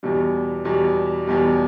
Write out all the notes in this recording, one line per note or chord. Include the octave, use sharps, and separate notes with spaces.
E2 B2 G3
E2 B2 G3
E2 B2 G3